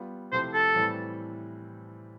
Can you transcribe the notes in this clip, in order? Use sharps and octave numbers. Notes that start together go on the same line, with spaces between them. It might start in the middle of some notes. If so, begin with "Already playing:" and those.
Already playing: G3 B3 F4
C3 F3 A3 E4 G4 C5
A4
A2 E3 G3 C4